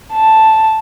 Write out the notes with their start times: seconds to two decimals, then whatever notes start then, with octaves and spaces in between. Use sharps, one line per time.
0.12 A5